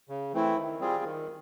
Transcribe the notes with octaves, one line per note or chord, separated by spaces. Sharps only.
C#3
E3 A3 C4 E4
D#3
G3 C4 F4 G#4
D#3